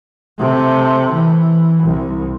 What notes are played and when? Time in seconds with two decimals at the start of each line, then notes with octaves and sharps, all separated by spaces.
0.39 C3 A3
1.13 E3
1.83 C2